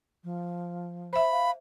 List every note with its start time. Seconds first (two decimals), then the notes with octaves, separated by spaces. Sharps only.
0.24 F3
1.13 C5 E5 B5
1.32 F5